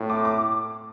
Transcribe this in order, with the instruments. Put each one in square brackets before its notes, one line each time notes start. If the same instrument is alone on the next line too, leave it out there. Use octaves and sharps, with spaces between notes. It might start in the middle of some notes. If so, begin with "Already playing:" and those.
Already playing: [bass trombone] A2
[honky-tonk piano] D6
D6